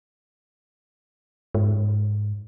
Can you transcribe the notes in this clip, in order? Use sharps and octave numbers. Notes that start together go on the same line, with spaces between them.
G#2